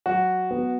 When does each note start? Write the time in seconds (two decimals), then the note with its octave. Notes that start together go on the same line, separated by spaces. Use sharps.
0.06 F#3 F#4
0.51 B3